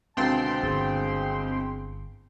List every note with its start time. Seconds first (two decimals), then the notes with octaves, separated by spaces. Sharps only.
0.17 C#2 B2 D3 C4 G5 A5 C6
0.63 G1 G#4